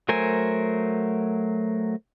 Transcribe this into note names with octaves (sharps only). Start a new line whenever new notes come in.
F#3 A3 A#4 C5 G#5